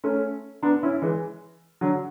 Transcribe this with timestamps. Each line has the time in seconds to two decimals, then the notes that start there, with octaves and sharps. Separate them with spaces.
0.04 A3 C#4
0.63 B3 D4
0.83 C#4 E4
1.02 E3 G#3
1.81 D3 F#3